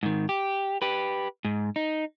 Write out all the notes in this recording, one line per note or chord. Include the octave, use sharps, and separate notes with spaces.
G#2 D#3
G4
G4 B4
G#2
D#4